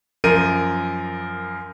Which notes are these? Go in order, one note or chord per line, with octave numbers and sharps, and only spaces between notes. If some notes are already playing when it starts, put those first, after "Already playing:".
F#2 F3 A#4 D#7